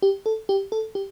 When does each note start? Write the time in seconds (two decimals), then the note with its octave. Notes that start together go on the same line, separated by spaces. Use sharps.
0.02 G4
0.26 A4
0.49 G4
0.72 A4
0.95 G4